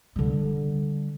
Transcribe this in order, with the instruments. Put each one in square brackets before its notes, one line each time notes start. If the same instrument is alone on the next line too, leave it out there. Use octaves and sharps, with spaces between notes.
[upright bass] D3 G3